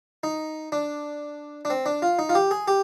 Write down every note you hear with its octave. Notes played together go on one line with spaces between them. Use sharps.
D#4
D4
D4
C4
D4
F4
D#4
F4
G4
G#4
G4